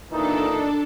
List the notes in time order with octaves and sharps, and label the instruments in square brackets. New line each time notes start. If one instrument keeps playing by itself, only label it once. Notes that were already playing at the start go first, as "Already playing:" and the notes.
[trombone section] A#2 E3 D#4 [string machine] D4 A4